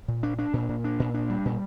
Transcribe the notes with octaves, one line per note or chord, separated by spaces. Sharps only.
A#2
D4
D4
A#2
A#2
D4
A#2
D4
G3
A#2